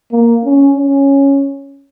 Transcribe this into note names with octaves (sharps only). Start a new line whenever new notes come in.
A#3
C#4
C#4